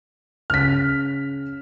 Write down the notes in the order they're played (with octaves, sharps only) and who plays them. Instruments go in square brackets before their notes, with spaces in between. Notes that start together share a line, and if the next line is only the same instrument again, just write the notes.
[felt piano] C#3 C#4 [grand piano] F6 B6